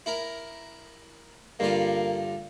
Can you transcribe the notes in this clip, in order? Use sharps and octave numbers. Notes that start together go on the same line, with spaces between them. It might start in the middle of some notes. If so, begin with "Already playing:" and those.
E4 A#4
G2 D3 A#3 F4